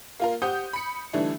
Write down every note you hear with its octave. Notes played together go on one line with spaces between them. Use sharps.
A#3 F4 A#4
G4 C5 F#5 D#6 G6
B5 C#7
D3 E3 G3 A3 D4 D#4